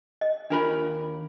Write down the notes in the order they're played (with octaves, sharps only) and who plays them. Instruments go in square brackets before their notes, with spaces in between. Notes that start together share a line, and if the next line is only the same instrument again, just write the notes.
[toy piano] D#5
[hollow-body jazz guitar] D#2 A#4 B5 [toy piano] D4 F4